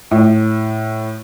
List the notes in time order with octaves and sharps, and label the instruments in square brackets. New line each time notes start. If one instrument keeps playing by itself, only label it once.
[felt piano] A2